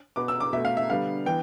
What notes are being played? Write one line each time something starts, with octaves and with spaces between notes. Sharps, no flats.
B2 B3 D6
E6
D6
B2 A3 E5
F5
E5
D3 G3 B3 F5
E3 B3 G5